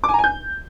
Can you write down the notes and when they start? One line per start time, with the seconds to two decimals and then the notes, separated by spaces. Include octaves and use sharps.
0.04 D6
0.09 G#5
0.14 A#5
0.19 G#5
0.24 G6